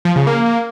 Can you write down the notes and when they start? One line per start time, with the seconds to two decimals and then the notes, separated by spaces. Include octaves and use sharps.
0.05 F3
0.16 C#3
0.27 A#3